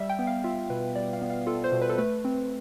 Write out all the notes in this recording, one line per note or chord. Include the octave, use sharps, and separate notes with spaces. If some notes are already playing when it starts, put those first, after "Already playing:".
Already playing: G3 E5
G5
B3
F5
F4 E5
B2 B4
G3 D5
F5
B3
F5
F4 A4
C5
B2
B4
A4
A3 B4
C4